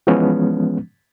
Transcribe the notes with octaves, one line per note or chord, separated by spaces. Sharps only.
E3 F3 G#3 B3 C#4